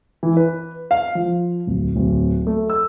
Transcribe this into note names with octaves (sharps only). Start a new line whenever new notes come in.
E3
B4
F5
F3
D1
D1
A3
E6